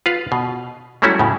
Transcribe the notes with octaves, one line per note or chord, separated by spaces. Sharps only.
F4 B4 F5
B2
F#3 G3 A3 C#4 E4 F#4
A2 C#3